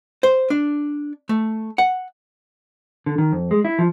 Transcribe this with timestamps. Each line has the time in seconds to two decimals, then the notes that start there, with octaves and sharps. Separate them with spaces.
0.23 C5
0.50 D4
1.29 A3
1.78 F#5
3.06 D3
3.18 D#3
3.32 F2
3.51 G#3
3.65 E4
3.79 F3